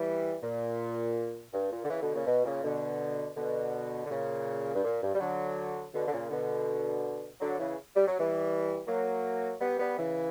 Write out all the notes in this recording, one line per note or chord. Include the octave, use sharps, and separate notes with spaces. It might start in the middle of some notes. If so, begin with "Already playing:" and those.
Already playing: E3 G3
A#2
G2
A#2
D3
C#3 E3
B2 D3
A#2 C#3
B2
A#2 C#3
B2 D3
B2 D3
D3
A#2 C#3
G2
A#2
G2
G3
D3 F#3
B2 D3
D3
A#2 C#3
B2 D3
D3 F#3
C#3 E3
G3
F#3
E3 G3
F#3 A#3
G3 B3
G3 B3
C#3 E3